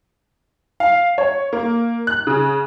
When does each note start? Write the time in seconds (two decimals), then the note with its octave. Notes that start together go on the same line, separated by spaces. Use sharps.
0.80 F5
1.18 C#5
1.53 A#3
2.07 F#6
2.27 C#3